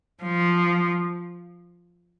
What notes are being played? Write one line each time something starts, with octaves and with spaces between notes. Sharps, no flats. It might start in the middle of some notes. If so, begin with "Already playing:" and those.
F3